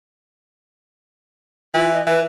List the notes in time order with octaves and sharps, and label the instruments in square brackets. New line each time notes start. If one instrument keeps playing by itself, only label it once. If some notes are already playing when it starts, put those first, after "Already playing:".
[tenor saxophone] E3 [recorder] F4
[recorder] D#5
[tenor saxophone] E3 [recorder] B4